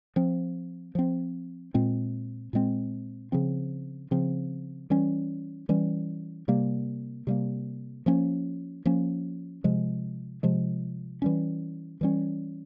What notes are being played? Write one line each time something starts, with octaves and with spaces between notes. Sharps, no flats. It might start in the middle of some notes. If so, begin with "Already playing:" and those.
F3 C4
F3 C4
A#2 G#3 C4
A#2 G#3 C4
C#3 F3 C4
C#3 F3 C4
E3 G3 C#4
E3 G3 C#4
C3 G3 A#3
C3 G3 A#3
F3 A#3 C#4
F3 A#3 C#4
C3 F3 G#3
C3 F3 G#3
E3 G3 C#4
E3 G3 C#4